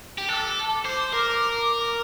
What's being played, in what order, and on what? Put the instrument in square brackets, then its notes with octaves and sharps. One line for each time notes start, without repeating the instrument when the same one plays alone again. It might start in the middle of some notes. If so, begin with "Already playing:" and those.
[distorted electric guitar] G4
[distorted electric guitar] A4 [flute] D6 F#6
[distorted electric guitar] C5
A#4